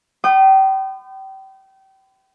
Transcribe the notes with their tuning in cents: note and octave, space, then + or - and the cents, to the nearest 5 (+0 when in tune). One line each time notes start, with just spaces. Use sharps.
G5 -30 B5 +40 D#6 -35